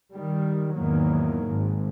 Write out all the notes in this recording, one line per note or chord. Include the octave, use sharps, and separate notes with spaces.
D#3 G3
E2 G#2 D#3 F#3 A#3
G#1 G#2